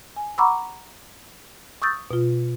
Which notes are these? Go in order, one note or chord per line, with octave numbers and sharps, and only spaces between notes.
G#5
F#5 A#5 B5 C#6 D6 E6
C#6 D#6 E6 G6 A6
B2 F4